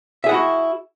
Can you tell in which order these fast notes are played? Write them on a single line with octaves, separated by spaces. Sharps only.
E5 G#4 F#5 E4 F#4